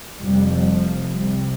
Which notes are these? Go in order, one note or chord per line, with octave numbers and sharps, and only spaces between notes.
F1 F2 C3 G3
F3
C2 C3 G3